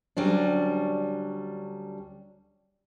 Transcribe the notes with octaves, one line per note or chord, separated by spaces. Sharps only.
D2 F#3 G3 C#4 D4